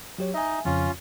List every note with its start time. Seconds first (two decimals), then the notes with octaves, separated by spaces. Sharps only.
0.18 F#3 G4 C#5
0.34 D#4 D#5 E5 G#5
0.65 F2 C#3 F3 C#4 F4